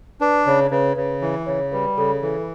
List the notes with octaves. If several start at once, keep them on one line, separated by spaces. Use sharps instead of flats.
D4 B4
C#3 C#5
C#3 B4
C#3 B4
E3 B4
C#3 C#5
G3 B4
C#3 A4
E3 A4